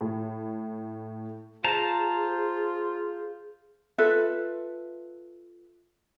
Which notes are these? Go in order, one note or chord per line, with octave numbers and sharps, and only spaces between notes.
A2
F4 G#4 C5 A5 A#5
F4 A4 B4 E5